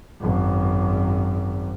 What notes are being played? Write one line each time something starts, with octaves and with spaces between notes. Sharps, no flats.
G#1 F#2